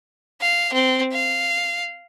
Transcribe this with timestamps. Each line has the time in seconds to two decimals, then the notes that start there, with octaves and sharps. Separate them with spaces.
0.41 F5
0.73 C4
1.12 F5